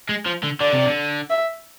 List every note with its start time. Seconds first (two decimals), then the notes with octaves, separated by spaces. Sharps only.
0.09 G#3
0.26 F3
0.44 D3
0.61 D3 D5
0.73 C3
0.85 D3
1.30 E5